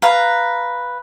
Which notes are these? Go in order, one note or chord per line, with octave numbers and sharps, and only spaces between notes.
B4 F5 A#5